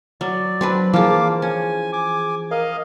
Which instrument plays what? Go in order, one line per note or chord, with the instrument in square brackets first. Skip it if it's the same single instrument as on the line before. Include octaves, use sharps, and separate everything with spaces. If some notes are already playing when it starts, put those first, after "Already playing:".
[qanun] F#3 [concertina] D5
[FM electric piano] F#3 [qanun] C4 D4 B4
[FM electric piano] E3 G#4 [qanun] F3 A5 [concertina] A#3 F5 D6
[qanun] C#4 [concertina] G#5
[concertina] G#5 D6
[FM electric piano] A#4 [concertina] D#5 F5